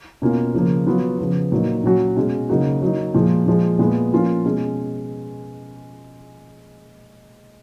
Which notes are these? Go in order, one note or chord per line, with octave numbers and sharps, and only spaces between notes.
B2 A#3 C#4 F4
C#3 F3 A#3
F#3 B3 F4
C#3 F3 B3
A#2 F#3 A#3 D#4
A#2 F#3 C#4 F#4
B2 G#3 C#4 F#4
C#3 F#3 A#3 D#4 F#4
F#3 A#3 D#4
A#2 F3 G#3
A#2 F3 G#3
A#2 G#3 B3
F3 A#3 C#4 F4
B2 G#3 C#4